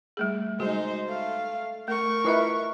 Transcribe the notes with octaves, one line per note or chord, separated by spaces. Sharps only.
G3 A3 G#4
G#3 D#4 F#4 C5
A3 F5
A3 A#4 C#6
E4 F4 B4 D#5 E5